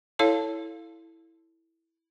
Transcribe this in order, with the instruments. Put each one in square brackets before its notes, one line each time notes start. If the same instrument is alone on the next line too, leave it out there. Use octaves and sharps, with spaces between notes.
[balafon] E4 A4 C#5 F5 A5